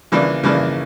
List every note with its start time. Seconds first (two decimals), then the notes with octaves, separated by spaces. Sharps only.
0.12 C#3 E3 A#3 D4
0.43 C#3 E3 A#3 D4